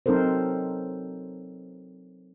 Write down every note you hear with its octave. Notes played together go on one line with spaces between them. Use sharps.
F#3 C4 D#4 A4 A#4 C5